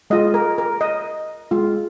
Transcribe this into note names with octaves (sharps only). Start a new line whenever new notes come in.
G#3 F4 D#5
A#4
A#4
D#5
G#3 F4